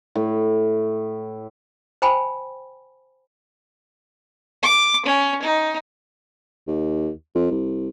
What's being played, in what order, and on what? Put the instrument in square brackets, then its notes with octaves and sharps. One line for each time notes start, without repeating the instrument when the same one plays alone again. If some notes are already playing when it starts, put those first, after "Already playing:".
[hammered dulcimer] A2
[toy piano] C5 G5 G#5 B5
[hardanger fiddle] D6
C#4
D#4
[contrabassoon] D#2
F2
C2